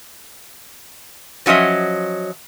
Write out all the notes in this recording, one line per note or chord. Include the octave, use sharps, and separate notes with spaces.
F3 F#3 C#4 D#5 E5